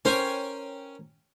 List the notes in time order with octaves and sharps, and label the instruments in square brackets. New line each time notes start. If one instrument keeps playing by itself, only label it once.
[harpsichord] C#4 G5 G#5 [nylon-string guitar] A#4 C5 C#5